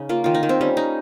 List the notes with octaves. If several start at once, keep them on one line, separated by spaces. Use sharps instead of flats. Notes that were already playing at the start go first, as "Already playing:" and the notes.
Already playing: C#3 C#4 D#4
A#3 F4
D#3 F4
D#4
D#3
C4
G3 C#4
G3 D#4